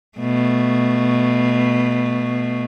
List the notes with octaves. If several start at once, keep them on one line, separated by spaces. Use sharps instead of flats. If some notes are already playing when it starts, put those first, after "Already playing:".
B2 A3